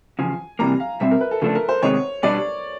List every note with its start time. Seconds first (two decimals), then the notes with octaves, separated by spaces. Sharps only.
0.19 E2 C#3 F3 G#5
0.59 C3 E3 G3 A#3 A#5
0.80 F5
1.00 B2 G3 C4 E5
1.11 A#4
1.21 B4
1.31 A4
1.41 C#3 F3 A3 D4 A4
1.55 A#4
1.69 C5
1.82 C3 D#3 G#3 B3 C#5
2.23 B2 G3 B3 D4 D5